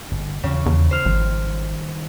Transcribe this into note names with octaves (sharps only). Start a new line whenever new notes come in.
G1
D#2 C#3 E3 F3
E2
C5 F6
G#1 D#3 F3 G3